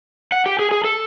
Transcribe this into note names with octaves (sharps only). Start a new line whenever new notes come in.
F#5
G4
G#4
G#4
A4